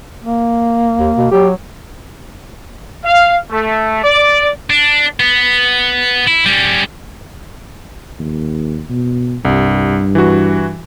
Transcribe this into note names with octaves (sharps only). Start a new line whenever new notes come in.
A#3
D#2
B2
F#3 G4
F5
A3
D5
D4
B3
E4
G3 C#4
D#2
B2
C2 G2
E3 F#4